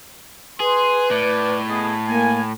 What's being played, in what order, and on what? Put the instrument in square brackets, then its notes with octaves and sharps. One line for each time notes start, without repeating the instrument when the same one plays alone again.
[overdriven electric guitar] G#4 [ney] B4 [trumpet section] C6
[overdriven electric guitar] A2 [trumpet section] D5
[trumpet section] B3 G#4 D#5
[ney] A#3 [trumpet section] G#5